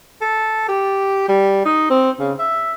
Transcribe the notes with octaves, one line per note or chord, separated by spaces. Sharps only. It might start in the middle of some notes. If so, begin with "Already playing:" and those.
A4
G4
G3
D#4
C4
C#3
E5